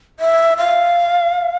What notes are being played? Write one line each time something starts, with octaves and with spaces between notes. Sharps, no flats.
E5
F5